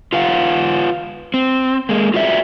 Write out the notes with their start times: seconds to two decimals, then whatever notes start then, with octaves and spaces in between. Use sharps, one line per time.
0.13 F4 B4 F5 F#5
1.34 C4
1.89 G#3 A#3
2.14 F4 F#4 B4 D5 E5